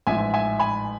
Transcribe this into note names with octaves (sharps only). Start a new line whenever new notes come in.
A1 G#2 F3 E5 G#5
E5 G#5
G#5 B5